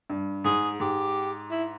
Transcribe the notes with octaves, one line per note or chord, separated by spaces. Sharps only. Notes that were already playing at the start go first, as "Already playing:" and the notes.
G2
G#2 G#4
G#2 G4
E4